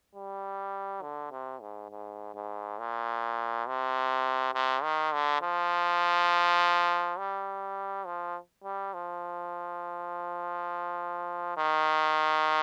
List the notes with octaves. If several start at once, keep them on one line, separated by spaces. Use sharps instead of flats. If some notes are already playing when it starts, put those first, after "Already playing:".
G3
D3
C3
G#2
G#2
G#2
A#2
C3
C3
D#3
D3
F3
G3
F3
G3
F3
D#3